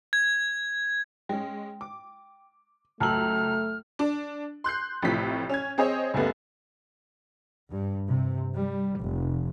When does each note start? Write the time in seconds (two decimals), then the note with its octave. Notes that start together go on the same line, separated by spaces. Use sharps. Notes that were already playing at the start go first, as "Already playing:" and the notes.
0.13 G#6
1.29 G#3 C#4 G5
1.81 D6
3.00 C#2 F#2 A3 A5 A#5 E6 F6 F#7
3.99 D4
4.64 C6 F#6 G6 C7
5.02 A1 A2 C3 F3 B6
5.50 C#4 G#6
5.78 C4 G#4 C5 C#5 D#5
6.14 C#2 F#2 G3 A3 B3
7.70 G2
8.07 C3
8.56 G3
8.99 F1